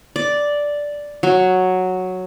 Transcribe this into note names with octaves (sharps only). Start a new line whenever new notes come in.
D5
F#3